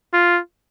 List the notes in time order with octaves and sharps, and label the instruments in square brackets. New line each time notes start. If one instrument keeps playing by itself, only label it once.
[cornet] F4